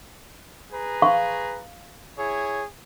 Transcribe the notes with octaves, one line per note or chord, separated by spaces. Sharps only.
G#4 B4 A#5
F5 C6 C#6
E4 G#4 C#5